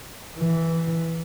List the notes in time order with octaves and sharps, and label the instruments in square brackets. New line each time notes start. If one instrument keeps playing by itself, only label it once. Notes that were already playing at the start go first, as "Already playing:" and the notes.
[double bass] E3